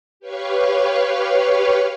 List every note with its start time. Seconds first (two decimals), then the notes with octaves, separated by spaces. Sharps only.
0.20 G4 B4 C#5 F5 C#6